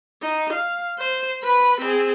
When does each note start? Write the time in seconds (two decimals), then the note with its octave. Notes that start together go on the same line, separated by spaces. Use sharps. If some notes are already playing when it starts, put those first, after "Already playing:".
0.22 D#4
0.53 F5
0.99 C5
1.43 B4 B5
1.81 C4 G#4